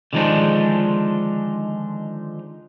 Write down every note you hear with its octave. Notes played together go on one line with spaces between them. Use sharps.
D3 D#3 F3 G#3 D4 D#4